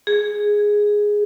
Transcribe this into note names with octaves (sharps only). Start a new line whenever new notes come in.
G#4